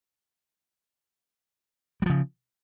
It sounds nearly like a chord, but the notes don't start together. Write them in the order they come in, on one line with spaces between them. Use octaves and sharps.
G3 F3 C#3